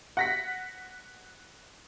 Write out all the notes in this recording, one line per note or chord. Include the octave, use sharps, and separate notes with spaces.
F#5 A#6 B6